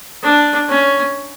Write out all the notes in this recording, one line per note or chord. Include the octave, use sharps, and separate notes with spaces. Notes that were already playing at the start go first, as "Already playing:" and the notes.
D4
C#4